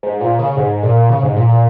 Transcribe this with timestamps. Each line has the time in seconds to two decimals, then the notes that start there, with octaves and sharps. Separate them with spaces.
0.03 G#2
0.21 A#2
0.39 C#3
0.57 G#2
0.83 A#2
1.09 C#3
1.22 G#2
1.36 A#2
1.49 A#2